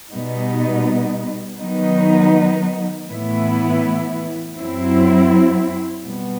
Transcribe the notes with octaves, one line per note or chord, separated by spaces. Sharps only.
B2 G3 B3 D#4
D#3 F#3 B3 D#4
A2 E3 B3 E4
F#2 F#3 C4 E4
B2 G3 B3